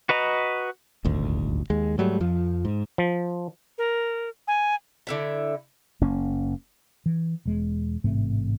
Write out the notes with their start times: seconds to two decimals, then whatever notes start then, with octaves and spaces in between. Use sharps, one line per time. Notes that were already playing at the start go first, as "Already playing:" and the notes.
0.09 F#4 B4 D#5 A#5
1.05 D#1 G#1 D2
1.70 D#2 G#3
1.98 G#2 F#3 G3 A3
2.20 F2 F3
2.65 G#2
2.98 F3
3.78 A#4
4.48 G#5
5.07 D3 E4 E5
6.01 F#1 A#3 C#4
7.06 E3
7.45 E1 E2 G#3
8.04 A1 G#2 C3 A3